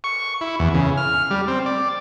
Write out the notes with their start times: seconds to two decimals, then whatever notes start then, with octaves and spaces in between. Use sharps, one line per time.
0.04 C#6
0.41 E4
0.59 E2
0.74 C#3
0.97 F6
1.31 G3
1.48 C4
1.66 D5